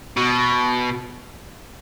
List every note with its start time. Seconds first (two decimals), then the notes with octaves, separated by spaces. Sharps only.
0.17 B2